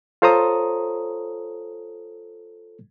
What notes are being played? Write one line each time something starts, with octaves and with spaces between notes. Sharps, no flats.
F4 A4 C5 C#5 A#5 D#6